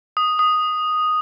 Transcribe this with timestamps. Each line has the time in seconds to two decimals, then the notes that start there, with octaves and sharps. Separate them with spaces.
0.17 D#6
0.39 D#6